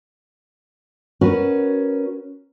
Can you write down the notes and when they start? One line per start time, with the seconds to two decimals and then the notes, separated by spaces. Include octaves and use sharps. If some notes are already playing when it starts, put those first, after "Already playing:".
1.21 C#4 F#4 A#4 B4